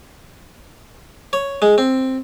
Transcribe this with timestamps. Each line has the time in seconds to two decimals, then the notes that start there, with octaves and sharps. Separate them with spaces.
1.33 C#5
1.62 G#3
1.78 C4